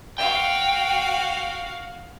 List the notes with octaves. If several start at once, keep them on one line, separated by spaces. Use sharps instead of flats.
F#4 F5 G5